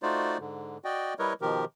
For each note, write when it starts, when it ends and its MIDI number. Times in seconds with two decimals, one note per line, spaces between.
0.03 0.38 57
0.03 0.38 63
0.03 0.38 65
0.03 0.38 66
0.03 0.38 72
0.03 0.38 74
0.40 0.78 44
0.40 0.78 50
0.84 1.14 66
0.84 1.14 74
0.84 1.14 75
0.84 1.14 79
1.19 1.33 55
1.19 1.33 64
1.19 1.33 70
1.19 1.33 71
1.19 1.33 73
1.19 1.33 75
1.41 1.65 47
1.41 1.65 51
1.41 1.65 53
1.41 1.65 67
1.41 1.65 70